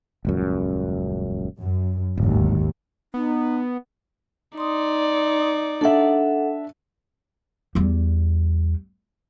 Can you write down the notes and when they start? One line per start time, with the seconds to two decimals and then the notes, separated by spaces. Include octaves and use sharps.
0.25 D#1 C#2 F#2
1.61 F#2
2.18 D1 G#1 D#2
3.14 B3 D#4
4.58 D#4 D5 C6 D#6
5.81 D4 A4 E5 F#5
7.75 E2 G3